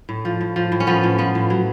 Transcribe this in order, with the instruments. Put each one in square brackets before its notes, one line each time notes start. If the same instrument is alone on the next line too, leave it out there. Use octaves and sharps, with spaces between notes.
[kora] A2
F3
A2
F3
A2
C#4
F3 B3
A2
F3 B3
A2
F#3